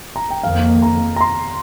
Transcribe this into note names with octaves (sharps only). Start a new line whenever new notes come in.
A#5
G5
F2 D#3 A#3 F5
A#5
A#5
C6